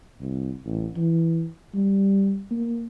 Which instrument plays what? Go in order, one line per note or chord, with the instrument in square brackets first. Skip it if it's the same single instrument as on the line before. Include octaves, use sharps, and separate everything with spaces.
[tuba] C2
A1
E3
G3
A#3